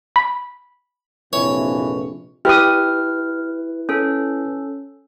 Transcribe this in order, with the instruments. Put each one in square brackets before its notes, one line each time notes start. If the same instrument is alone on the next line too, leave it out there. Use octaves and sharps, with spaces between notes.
[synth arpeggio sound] B5
[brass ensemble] A#1 C3 [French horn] F2 [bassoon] E3 [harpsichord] C#5
[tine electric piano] E4 B4 [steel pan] G4 D#6 [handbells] F6
[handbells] C#4 A4